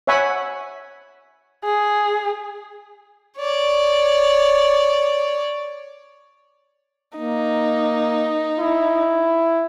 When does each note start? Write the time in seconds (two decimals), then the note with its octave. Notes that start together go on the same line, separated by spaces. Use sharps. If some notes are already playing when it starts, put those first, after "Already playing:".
0.07 C#5 E5 F#5 G#5 B5 C#6
1.64 G#4
3.38 C#5 D5
7.18 A#3 D#4
8.60 E4